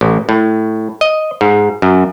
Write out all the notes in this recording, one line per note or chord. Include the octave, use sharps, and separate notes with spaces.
A1
A2
D#5
G#2
F#2